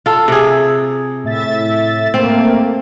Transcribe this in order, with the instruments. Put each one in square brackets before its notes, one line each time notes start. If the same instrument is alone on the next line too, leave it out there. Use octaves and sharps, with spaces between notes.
[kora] F4 A4
C3 G#4
[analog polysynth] A2 E5 A6
[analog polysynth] A3 A#3 [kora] C4